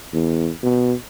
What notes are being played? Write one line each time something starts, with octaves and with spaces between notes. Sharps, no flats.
E2
B2